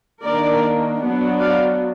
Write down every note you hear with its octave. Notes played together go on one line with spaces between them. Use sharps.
D#3 A#3 D4 A#4 D5
F#3 B3 D4
D5 F5